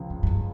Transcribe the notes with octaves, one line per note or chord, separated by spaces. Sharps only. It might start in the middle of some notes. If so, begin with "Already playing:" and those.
Already playing: C#2 C#3 F3
G2
G2
F#2